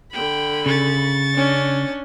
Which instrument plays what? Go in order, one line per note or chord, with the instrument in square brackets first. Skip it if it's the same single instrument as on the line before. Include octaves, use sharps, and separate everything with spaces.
[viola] D3 B5 [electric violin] G5
[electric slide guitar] C#3 [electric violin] C#6 A6
[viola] C#4 D4